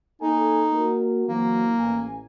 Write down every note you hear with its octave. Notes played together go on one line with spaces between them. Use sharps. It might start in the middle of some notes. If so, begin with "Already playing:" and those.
A#3 D#4 A4 G#5
A#3 F#4 A#4
E3 F#3 A#3 C4
A1 G#5